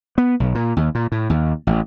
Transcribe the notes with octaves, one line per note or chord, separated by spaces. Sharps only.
B3
B1
A#2
D#2
A#2
A2
D#2
A1